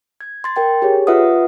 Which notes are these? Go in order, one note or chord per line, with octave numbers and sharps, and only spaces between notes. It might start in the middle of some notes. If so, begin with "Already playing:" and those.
G#6
C6 A6
A#4 G5 A6
G4 G#4 C#5
F4 B4 E5 F#5 D#6